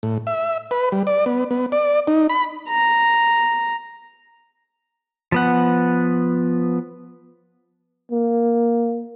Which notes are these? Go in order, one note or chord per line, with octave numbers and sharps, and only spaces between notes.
A2
E5
B4
G3
D5
B3
B3
D5
D#4
B5
A#5
F3 B3 F#5
A#3